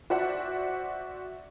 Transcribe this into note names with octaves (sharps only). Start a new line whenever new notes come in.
F#4 C5 D5 E5 F#5